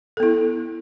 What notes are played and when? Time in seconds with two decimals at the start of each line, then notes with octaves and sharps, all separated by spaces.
0.17 A4
0.20 B3
0.23 E4